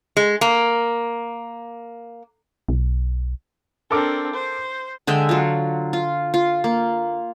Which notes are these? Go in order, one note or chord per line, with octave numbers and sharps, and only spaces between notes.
G#3
A#3
B1
C4 D4 A4 A#4 D6
C5
D3 G#3 E5 G5
F#3 F4
F4
F4
A#3